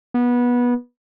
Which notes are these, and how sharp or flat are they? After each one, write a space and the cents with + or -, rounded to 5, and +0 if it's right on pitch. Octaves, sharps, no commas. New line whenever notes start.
B3 -20